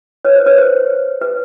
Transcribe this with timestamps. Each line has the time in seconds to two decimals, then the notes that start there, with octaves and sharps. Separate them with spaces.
0.25 B4 C#5
0.36 C5
0.46 B4 C#5
0.58 C5
1.21 B4